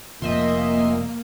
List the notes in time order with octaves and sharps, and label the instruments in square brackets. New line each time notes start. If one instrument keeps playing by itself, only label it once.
[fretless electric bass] F1 F3 [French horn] A#2 [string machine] A#3 [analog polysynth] D#5 E5 C6